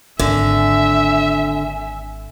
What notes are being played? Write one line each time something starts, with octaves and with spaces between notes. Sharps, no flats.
G#1 D3 E5 G#5